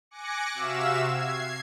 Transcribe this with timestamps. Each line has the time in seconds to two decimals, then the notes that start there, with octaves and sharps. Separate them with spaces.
0.11 G#5 D6 F#6 A#6 C#7
0.54 C3 F#4 E5 F5 E6 E7
1.06 G#6 C7